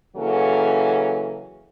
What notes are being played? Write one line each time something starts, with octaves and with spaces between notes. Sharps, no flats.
C#3 E3 F#3 A#3 C#4 A4